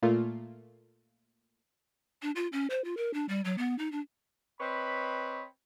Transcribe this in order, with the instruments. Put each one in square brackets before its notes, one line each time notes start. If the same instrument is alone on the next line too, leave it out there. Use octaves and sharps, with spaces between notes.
[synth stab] A#2 A3 A#3 F4
[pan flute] D4
F4
C#4
C5
F4
A#4
D4
G3
F#3
B3
D#4
D4
[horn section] C4 B4 C#5 D#5 B5